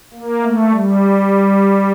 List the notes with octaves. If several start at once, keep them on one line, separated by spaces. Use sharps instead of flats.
A#3
A3
G3